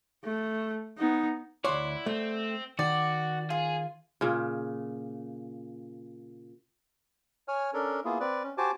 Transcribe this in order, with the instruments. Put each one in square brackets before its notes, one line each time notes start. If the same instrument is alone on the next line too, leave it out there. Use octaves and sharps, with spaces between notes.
[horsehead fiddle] A3
B3 D#4
[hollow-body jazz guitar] D2 C#5 [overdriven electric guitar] E4 [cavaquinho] D5 F#5 C6
[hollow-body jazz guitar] A3 [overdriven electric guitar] C4
[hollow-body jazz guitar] D#3 [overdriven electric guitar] F#4 [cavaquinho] D5
[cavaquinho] F4 [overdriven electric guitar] G#4
[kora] A#2 C#3
[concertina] C#5 G#5 F6
C#4 D4 A4 A#4
A#3 B3 E4 F4 G#4
C4 B4 D5
C#4
F#4 G4 C5 G#5 A5 D6